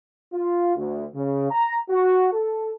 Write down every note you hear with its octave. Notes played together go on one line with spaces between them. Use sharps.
F4
D2
C#3
A#5
F#4
A4